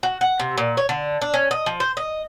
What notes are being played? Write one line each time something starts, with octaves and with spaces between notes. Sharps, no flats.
F#4
F#5
C3
A#2
C#5
D3
D4
C#4
D#5
F3
C5
D#5